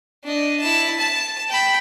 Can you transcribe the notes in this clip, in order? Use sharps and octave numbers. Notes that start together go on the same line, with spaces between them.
D4 D#5
E4 A5
A5
G5 B5